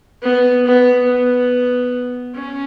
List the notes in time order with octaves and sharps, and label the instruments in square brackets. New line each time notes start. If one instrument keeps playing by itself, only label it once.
[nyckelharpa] B3
B3
B3
C#4